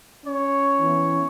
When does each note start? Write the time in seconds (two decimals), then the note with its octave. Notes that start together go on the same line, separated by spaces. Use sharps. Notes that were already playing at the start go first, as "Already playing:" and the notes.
0.25 C#4 C#5
0.80 E3 B3 E4